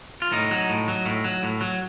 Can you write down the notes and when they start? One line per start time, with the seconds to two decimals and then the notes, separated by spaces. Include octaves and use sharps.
0.22 F4
0.32 A2 D#4
0.51 F#3
0.69 A2
0.88 F#3
1.05 A2
1.24 F#3
1.43 A2
1.61 F#3